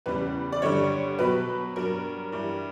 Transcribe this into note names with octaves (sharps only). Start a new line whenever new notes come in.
E2 C#3 G3 B4
D5
G2 D3 G3 C#5
B2 F#3 B4
G2 F#3 A#4
G2 E3 G3